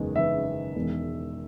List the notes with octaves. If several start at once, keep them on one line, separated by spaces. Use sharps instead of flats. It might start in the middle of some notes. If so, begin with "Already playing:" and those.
Already playing: F#1 E2 D#3 G#3 B3
F#1 E2 D#3 G#3 B3 E5
E1 E2 D#3 G#3